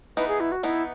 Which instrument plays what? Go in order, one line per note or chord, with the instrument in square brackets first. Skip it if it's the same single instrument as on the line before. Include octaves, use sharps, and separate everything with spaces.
[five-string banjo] E3 B3 D#4 [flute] B4
[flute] G#4
E4
F#4
[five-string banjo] E3 B3 D#4 [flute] E4